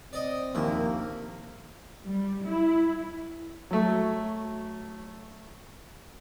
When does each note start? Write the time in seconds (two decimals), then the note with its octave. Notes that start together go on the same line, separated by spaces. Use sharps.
0.13 C4 D5 D#5
0.55 A#1 D#2 A#3 E4
2.04 G3
2.46 E4
3.71 F#3 A3